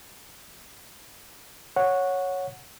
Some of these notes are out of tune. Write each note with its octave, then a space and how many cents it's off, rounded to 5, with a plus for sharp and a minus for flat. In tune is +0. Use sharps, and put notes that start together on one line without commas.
C#5 +0 F#5 -15